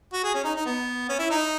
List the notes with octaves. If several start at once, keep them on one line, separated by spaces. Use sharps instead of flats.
F#4
G#4
C#4
D#4
D#4
B3
C#4
E4
D#4